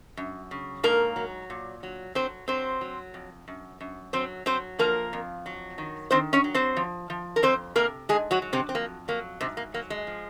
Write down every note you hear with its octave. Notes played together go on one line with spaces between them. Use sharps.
F#2
C#3
G#2 A#3 A#4
F#3
A#2
F#3
F#3 C4 C5
F#3 C4 C5
F#3
F2
F#2
F#2
F#3 C4 C5
F#3 C4 C5
F3 A#3 A#4
F2
F#3
D#3
D#3 C4 C5
C#4 C#5
F#3
C4 C5
F3
F3
A#4
F2 C4 C5
C3 A#3 A#4
G#2 G#3 G#4
F#3 F#4
F#3
C3 C4
C4
F2 A#3
F#3 A#3
G#2 C3 C4
A#3
F#3 A#3
G#3
F3